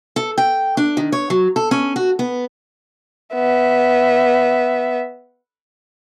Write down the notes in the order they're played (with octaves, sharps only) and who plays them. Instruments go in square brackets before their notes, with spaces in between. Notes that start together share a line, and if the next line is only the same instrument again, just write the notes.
[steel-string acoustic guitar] A4
G5
D4
D#3
C#5
F#3
A4
C#4
F#4
B3
[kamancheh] B3 E5